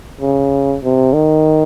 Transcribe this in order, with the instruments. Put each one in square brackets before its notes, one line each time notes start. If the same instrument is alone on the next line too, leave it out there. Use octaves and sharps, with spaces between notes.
[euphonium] C#3
C3
D#3